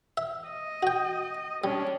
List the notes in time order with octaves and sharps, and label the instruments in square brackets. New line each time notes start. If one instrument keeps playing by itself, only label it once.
[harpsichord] E5
[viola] D#5
[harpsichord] F#4 G5
[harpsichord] G3 [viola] C#4 D4